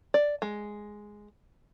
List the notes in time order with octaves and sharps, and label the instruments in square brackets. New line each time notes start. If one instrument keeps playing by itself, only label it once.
[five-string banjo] D5
G#3